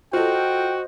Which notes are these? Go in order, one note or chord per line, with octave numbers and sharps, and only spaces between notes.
F4 F#4 A4 C5 D#5 G5